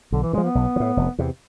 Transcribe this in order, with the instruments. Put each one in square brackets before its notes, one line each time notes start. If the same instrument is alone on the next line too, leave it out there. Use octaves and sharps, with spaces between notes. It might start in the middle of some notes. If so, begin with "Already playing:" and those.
[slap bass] B1 [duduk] D3
[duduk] E3
[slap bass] A2 [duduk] G#3
[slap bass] F3
[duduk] B3
[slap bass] B1
F3
A2
F1
E2 C3